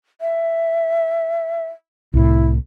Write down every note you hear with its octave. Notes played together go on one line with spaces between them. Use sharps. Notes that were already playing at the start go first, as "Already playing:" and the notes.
E5
C2 A2 E4